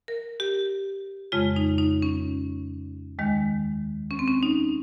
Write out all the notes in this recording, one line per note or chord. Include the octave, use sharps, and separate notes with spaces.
A#4
G4
F2 C#3 G#3 F4
D#4
D#4
C#4
D#2 D#3 G#3
C#4
C4
C#4
D#4